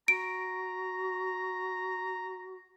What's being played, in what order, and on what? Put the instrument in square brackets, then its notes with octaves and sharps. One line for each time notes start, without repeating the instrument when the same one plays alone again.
[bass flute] F#4 [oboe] A#5 [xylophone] D7